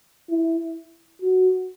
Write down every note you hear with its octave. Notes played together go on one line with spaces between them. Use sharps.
E4
F#4